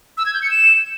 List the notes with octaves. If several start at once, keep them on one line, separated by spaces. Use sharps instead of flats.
E6
G#6
G6
C#7
E7